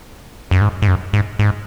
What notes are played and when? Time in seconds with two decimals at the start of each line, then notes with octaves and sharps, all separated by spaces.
0.51 F#2
0.61 G#2
0.82 G#2
0.87 F#2
1.13 G#2
1.39 G#2